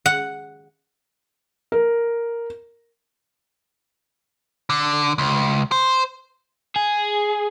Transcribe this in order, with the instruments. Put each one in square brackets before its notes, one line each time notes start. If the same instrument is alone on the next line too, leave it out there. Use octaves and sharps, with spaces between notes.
[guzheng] F#5
[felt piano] A#4
[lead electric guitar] D3
C#2
C5
[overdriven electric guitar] G#4